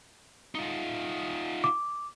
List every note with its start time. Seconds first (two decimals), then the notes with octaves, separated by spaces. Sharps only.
0.55 D#4 F4
1.64 D6